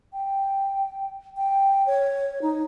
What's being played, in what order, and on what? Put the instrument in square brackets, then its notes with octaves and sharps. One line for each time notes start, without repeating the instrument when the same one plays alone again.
[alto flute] G5
G5
C#5
D#4